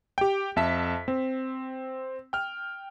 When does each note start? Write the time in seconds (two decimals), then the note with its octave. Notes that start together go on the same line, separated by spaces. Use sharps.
0.18 G4 G5
0.56 F2 E5 A5 B6
1.08 C4
2.33 G5 F6